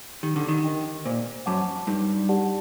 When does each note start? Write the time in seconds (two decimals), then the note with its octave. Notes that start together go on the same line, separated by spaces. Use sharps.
0.23 D#3 G4
0.36 D3
0.48 D#3
0.64 A#4 D#5 G5
1.05 A#2 C5
1.46 F#2 F#5 A5 D6
1.87 G2 D#4
2.29 G4 D5 F#5 A5